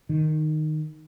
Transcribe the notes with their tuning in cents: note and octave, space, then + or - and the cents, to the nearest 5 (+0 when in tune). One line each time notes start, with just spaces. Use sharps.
D#3 -10